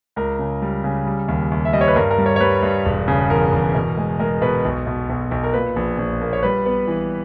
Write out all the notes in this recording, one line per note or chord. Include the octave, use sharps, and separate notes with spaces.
C#2 A#4
C#3
G3
C#3
G3
D#2
D#2
E5
G3 D#5
C#5
B4
G2 A#4
A#4
G3
C#5
C#5
G3 B4
G2
E1
C#3
E2 A#4
E2
B2
G#3
G#3 A#4
B2 B4
B1
B2
B1
B1
A#4
A#2 B4
A#1
A#1
A#3
C#5
G3 B4
B3
E3